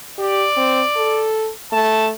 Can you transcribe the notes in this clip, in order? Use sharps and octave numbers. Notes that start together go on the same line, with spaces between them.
G4 D5
C4
A4
A3 A5